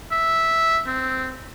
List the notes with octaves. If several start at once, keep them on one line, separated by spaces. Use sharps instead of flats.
E5
C4